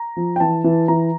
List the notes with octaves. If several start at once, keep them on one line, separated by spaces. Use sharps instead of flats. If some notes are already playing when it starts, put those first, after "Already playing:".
Already playing: A#5
F3
G5
E3 A5
E3
E3 A#5